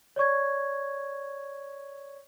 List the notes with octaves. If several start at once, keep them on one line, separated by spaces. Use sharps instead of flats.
C#5 D5 C#6 G#6